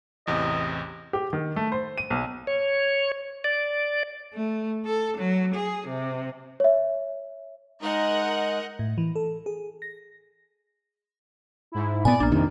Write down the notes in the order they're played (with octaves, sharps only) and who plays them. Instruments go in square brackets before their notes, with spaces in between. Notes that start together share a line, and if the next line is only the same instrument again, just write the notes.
[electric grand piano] A1 E2 C3 [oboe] D#5
[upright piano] G4
D#3
A3
C5
D#7
B1
[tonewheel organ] C#5
D5
[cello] A3
A4
F#3
G#4
C3
[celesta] C#5 E5
[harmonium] G#3 D#4 [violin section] A#4 D#5 F#5
[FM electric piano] A2
E3
A4
G#4
A#6
[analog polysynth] G#2 E4
[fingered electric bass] A#2 B3 [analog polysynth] D5 [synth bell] G#5
[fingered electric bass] A#1 [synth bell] A#3 D4
[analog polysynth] F2 C3 [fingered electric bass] D#3